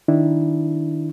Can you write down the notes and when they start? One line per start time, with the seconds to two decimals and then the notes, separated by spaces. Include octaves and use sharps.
0.08 D#3 D4 E4